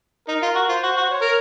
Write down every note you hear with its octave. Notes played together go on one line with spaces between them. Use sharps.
D#4 A#4
F4
F#4
F4 C5
F#4
F#4
C#5
A#4